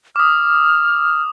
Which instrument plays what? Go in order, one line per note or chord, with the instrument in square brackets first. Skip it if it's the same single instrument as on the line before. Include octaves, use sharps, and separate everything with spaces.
[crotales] D6 D#6 [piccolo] F6